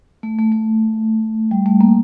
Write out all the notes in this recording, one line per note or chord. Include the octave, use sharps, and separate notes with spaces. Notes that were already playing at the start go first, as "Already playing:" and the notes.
A3
A3
A3
G3
A3
A#3